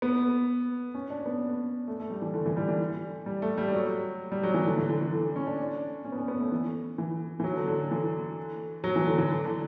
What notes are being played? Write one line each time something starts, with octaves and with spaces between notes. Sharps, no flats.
B3
C#4
D4
B3
A3
A3
G3
E3
D3
E3
G3
E3
G3
A3
G3
F#3
G3
F#3
E3
D3
E3
D3
E3
D3
C#4
D4
C#4
B3
C#4
B3
A3
E3
E3
E3
F#3
D3
D3
E3
F#3
E3
D3
E3
D3